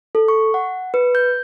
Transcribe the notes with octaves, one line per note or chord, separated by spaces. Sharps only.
A4
C#6
F#5
B4
G6